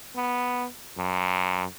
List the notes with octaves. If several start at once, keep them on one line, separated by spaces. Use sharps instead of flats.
B3
F#2